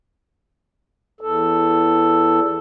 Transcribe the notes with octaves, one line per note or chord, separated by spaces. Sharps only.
E2 A4